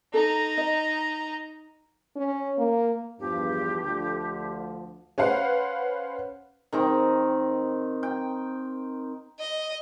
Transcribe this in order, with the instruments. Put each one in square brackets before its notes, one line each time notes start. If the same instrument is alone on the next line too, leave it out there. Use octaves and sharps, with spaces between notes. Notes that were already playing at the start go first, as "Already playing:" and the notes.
[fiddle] D#4 A#5 [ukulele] A4
[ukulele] D#5
[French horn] C#4
A#3
[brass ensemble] E2 G2 F3 [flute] G4
[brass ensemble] D2 D3 F3
[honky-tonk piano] C#4 B4 C5 F5 F#5
[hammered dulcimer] D#3 C4 D#4
G5
[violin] D#5